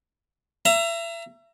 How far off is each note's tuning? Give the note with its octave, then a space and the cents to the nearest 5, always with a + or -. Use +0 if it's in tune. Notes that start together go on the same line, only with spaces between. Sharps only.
E5 +30 A#5 +0